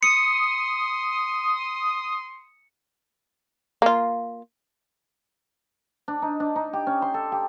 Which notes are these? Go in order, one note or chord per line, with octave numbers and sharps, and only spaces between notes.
C6 D#6 C#7
A#3 F4
D4
D#4
D4
D#4
G4
C#4
C6
A4
G4